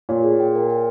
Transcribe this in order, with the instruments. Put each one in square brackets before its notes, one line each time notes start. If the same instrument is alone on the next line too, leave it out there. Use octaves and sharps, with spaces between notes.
[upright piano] A#2 [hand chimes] C#5
[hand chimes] G#4
G5
A#4
G5